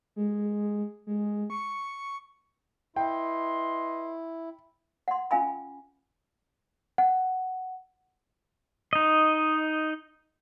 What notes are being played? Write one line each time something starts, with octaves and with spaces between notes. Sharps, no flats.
G#3
G#3
C#6
E4 B4 D#5 G5 C6
F#5 C6
C#4 F4 F5 G#5 B5
F#5
D#4 D#5